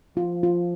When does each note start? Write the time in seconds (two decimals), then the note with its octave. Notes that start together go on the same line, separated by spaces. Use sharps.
0.17 F3 F4
0.43 F4